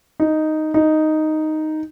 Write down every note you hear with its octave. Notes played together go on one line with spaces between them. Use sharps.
D#4
D#4